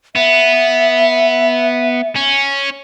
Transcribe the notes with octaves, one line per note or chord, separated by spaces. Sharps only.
B3 E5
C#4